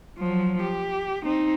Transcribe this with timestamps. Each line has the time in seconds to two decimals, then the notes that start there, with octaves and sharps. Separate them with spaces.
0.19 F3 F#3
0.62 G4
1.25 C4 D#4